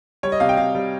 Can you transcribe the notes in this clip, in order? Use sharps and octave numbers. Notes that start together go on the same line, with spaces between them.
G3 C#5
D#5
C3 F5
G5
C3 F5
G3